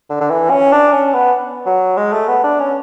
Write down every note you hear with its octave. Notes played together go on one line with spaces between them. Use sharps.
D3
D3
E3
C#4
D4
C#4
B3
F#3
G#3
A3
B3
D4
C#4